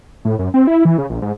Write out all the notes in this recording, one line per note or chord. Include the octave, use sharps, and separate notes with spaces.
A2
F#2
C4
E4
E3
C#3
A#1
G#2